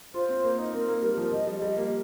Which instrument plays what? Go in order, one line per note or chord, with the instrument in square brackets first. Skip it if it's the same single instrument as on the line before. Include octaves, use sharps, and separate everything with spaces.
[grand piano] F4 [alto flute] C5
[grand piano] C4
A#3
D#4
[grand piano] C4 [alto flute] A#4
[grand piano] A#3
[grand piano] G3 [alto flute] A#4
[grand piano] F3
[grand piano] F3 [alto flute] D#5
[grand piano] G3
[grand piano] G3 [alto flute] D#5
[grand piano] A#3